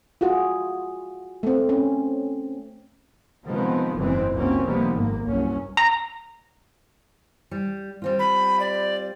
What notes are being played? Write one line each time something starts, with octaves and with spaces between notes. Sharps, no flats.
F4 F#4 G#4
A3 C4
C#4
C3 D#3 F3 G#3 B3 C4
F#1 G#2 C#3 E3 G#3 C4
C#2 F#2 F#3 A#3 C4 C#4
C3 D#3 F3 G3 A#3 B3
G#1 A#3
C2 G2 F#3 C#4
A#5
G3
G3 C4 F4
B5
D5